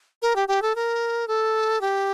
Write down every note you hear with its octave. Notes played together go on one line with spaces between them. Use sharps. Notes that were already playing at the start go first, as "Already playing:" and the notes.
A#4
G4
G4
A4
A#4
A4
G4